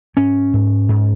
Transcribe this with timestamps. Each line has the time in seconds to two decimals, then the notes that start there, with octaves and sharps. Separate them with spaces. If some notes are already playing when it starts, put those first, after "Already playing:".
0.16 G#2 C#4
0.53 G#2
0.89 G#2